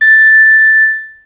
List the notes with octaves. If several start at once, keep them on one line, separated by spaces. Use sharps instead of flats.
A6